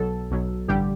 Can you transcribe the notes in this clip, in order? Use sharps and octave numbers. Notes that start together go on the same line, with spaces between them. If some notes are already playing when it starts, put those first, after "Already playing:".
Already playing: B1 B2 F#3 A4
B1 B2 F#3
A1 G2 D3 G3 G4